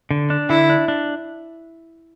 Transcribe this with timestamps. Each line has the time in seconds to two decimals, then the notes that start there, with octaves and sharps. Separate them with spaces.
0.11 D3
0.30 D4
0.50 D3 E4
0.70 D4
0.88 D4